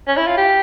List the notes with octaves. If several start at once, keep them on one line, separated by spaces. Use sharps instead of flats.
C#4
E4
F4
G4